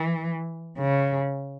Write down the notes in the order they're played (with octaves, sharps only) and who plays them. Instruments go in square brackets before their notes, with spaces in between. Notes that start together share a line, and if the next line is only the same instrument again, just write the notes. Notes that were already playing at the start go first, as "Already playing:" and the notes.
Already playing: [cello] E3
C#3